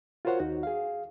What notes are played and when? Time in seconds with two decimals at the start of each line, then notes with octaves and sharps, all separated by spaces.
0.25 F4 F#4 A#4 C5 C#5 F#5
0.40 D#2 D#4 F#4
0.63 G#4 F5